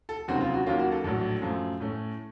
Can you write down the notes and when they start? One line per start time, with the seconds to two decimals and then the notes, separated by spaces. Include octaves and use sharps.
0.09 A4
0.28 F1 D#2 C#3 F#3 C4 F#4
0.41 F4
0.54 F#4
0.66 D#2 C#3 F#3 A#3 C#4 F4
0.79 F#4
0.91 A4
1.04 A#1 A2 F#3 A4
1.42 F#2 F3 A3
1.80 A2 A3 C#4